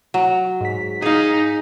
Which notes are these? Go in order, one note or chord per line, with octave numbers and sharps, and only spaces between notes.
F#3
G#2 B6
D#4 G#4 F5